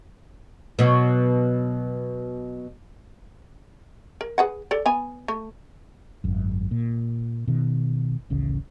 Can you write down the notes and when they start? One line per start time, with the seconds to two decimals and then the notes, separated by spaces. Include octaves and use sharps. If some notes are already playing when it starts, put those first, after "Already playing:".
0.79 B2 F#3 F#4
4.21 A#4
4.38 G#4 B4 F#5
4.71 A4 D5
4.86 B3 G#5
5.28 A3
6.24 G#1 F#2
6.71 A#2
7.48 B2 D#3
8.30 D1 A1 C#3